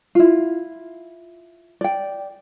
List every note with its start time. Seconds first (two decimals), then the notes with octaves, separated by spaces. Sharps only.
0.15 E4 F4
1.81 D5 G5